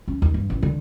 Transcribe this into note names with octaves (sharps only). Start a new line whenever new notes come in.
C#4
D#2
G2
A1
D3